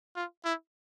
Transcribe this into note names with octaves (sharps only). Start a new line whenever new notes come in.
F4
E4